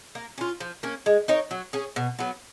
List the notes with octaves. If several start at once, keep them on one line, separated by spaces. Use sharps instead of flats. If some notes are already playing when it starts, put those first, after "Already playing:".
A#3
C#4 F4
F3
A#3 C#4
G#3
D#4 A#4 C#5
F#3
C#4 G#4
B2
F#3 B3